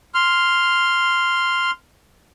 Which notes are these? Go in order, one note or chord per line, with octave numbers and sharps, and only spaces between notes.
C6 F6